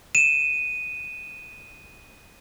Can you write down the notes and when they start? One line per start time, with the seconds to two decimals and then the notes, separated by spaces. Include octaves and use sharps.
0.15 D#7 E7